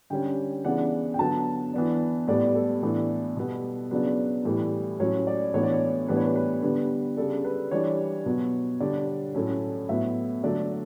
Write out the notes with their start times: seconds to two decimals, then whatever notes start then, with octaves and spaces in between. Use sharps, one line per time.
0.10 D3 G3 C#4 G5
0.65 C#3 E3 B3 D4 F#5
1.14 G5
1.19 D3 F#3 B3 A5
1.73 E3 B3 D4
2.28 A2 G3 B3 D5
2.55 A4
2.82 A2 E3 B3 D4
3.37 B2 G3 B3
3.91 C#3 F#3 B3 D4 B4
4.45 A2 E3 G3
5.00 A2 F#3 C#4 C#5
5.27 D5
5.54 A2 E3 B3 D4 C#5
5.63 D5
5.72 C#5
6.08 A2 E3 G3 B3 D4 B4
6.17 C#5
6.25 B4
6.36 B4
6.63 D3 G3 B3 B4
7.17 C#3 G3 D4 A4
7.44 B4
7.71 E3 G3 D4 C#5
8.26 B2 F#3 B3
8.80 D3 G3 D4 D5
9.34 A2 F#3 A3 C#4
9.89 A2 F#3 B3 E5
10.43 D3 F#3 A3 D4 D5